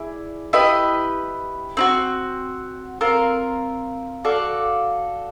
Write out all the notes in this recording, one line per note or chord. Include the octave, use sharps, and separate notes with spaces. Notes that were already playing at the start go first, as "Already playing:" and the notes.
Already playing: E4 G#4 D5
E4 G4 B4 D#5
C4 D#4 F#4
C4 F4 A#4
F#4 A4 D5 F5